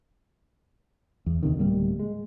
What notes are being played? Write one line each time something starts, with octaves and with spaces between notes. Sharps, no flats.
E2
D#2 C3 D#3
D1 G3 A#3
G#3